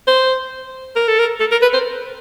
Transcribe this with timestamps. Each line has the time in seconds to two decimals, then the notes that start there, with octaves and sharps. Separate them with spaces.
0.07 C5
0.96 A#4
1.08 A4
1.19 A#4
1.40 A4
1.51 A#4
1.62 B4
1.73 C5